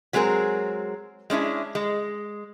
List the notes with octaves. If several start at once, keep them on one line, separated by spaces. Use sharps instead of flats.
F#3 G#3 C4 G#4 A#4
G#3 C#4 D4 E4
G#3